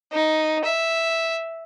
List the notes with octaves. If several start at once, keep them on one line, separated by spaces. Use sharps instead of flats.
D#4
E5